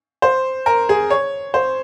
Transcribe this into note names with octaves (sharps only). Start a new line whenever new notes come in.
C5
A#4
G#4
C#5
C5